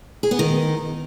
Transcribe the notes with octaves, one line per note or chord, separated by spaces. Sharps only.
G#4
B3
D#3